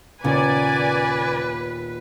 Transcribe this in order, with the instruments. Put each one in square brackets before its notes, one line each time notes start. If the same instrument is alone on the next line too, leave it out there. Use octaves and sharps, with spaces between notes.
[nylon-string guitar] D#2 A#2 B3 [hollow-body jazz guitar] C#3 [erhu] B4 [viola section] D5 G#5